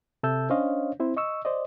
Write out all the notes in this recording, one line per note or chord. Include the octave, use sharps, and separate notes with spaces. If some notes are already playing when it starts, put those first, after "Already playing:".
C3 A4 E5 A5 E6 G6
C#4 D4 C5 C#5 D#5 F5
C4 E4 C5
D#5 C#6 E6
C5 D5 D#5